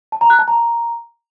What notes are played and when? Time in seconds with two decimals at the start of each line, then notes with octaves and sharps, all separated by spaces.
0.12 A5
0.21 A#5
0.30 F#6
0.39 A5
0.48 A#5